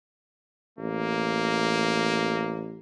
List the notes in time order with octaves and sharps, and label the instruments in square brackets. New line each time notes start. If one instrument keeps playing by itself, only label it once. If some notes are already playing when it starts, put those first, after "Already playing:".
[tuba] A1 [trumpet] A#3